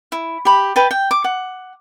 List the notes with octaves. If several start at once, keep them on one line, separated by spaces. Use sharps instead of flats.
E4
G4 B5
B4 G5 A5
G5
D6
F#5